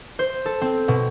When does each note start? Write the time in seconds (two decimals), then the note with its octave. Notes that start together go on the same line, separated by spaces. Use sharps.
0.19 C5
0.46 A4
0.62 C4
0.88 B2